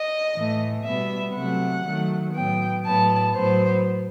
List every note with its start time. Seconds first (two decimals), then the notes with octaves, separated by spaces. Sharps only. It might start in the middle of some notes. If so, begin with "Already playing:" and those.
Already playing: D#5
0.34 A2 E3 A3
0.84 B2 G3 B3 E5
1.34 C3 F#3 A3 F#5
1.85 D#3 F#3 A3
2.34 A2 F#3 B3 G5
2.84 A2 F#3 B3 A5
3.34 A2 F#3 B3 C5